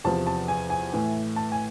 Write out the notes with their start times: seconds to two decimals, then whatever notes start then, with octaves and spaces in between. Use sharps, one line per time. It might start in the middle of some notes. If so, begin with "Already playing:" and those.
0.04 E2 C3 F3 A5
0.27 A5
0.48 G#5
0.70 G#5
0.92 A2 E3 A3
1.36 A5
1.52 G#5